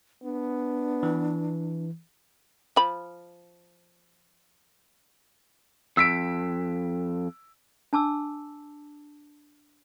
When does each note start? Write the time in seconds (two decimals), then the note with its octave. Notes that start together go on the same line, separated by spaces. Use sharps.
0.23 B3 D4
1.03 E3
2.76 F3 B5
5.97 F2 E6 B6 D7
7.93 D4 A5 D6 E6